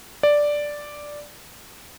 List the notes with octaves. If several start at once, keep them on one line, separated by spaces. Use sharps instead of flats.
D5